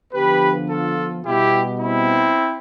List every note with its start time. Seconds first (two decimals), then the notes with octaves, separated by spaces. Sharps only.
0.13 D3 F3 B3 G4 B4
0.69 F4 A4
1.24 B2 G3 B3 E4 G4
1.80 C4 E4